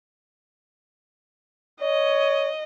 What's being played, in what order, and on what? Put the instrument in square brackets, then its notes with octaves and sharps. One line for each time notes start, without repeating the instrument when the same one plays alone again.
[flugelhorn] C#5 [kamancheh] D#5